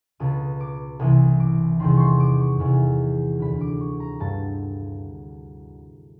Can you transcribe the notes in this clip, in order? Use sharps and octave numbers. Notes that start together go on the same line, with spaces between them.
C#2 B2 D#6
D6
C2 C3 E3 D#6
D6
E2 C3 D#3 C6
C6 C#6
D6
C#6
E2 C3 E3
D2 D3 B5
D6
C#6
A#5
G2 D3 A5